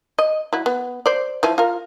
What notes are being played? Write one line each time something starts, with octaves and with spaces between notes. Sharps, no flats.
D#5
F#3 E4
B3
C5 D5
E3 F3 G#5
F4 A#4